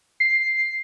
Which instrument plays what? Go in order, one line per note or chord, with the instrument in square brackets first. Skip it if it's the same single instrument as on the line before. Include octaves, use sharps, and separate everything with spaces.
[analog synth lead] C7